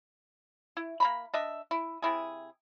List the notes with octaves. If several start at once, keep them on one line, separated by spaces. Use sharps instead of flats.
E4
A#3 A#5 B5
D4 D#5 E5
E4
C3 E4 G#4